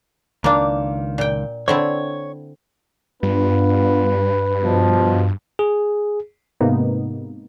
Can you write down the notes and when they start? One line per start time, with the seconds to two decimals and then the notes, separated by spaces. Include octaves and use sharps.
0.44 C#2 D#3 A#3 D4 F5
1.18 A#2 G5
1.68 D3 C4 E4 C#5
3.23 G2 B3 D4 F4 B4
4.63 B2 F3
5.59 G#4
6.60 G#2 C3 A#3 B3 D#4